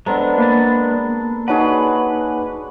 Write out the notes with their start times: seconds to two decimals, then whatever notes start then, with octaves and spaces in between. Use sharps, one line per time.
0.06 G#3 B3 C4 D4 A4 A#5
0.38 A#3 B5 A6
1.48 D4 D#4 F#4 G#4 B4 C#5 F#5